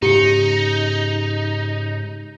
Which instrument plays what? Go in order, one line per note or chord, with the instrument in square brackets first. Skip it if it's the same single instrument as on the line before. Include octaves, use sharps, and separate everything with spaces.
[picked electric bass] G#2 C#3 [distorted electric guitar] D#4 [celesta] G4 C#7